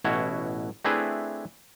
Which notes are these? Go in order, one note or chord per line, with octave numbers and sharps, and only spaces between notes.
A1 B2 E4 F#4 C#5
A3 C4 D4 E4 G#4 B4